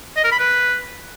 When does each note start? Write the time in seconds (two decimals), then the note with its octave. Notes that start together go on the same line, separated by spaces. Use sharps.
0.16 D#5
0.24 A#4
0.31 B5
0.39 B4